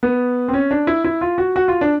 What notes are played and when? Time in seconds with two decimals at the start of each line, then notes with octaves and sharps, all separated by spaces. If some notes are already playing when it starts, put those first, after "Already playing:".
0.03 B3
0.48 C4
0.53 C#4
0.71 D4
0.87 E4
1.04 E4
1.21 F4
1.38 F#4
1.56 F#4
1.68 F4
1.81 D4